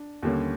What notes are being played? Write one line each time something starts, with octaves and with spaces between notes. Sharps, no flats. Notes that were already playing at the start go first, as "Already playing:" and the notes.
Already playing: D4
D#2 D3 G3 A#3 C#4